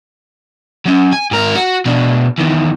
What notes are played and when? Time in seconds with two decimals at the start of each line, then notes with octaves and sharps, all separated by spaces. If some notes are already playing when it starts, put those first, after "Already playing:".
0.85 F#3 C#4
1.12 G#5
1.31 G#2 A#4
1.55 F#4
1.86 B2 D4
2.38 E2 D#3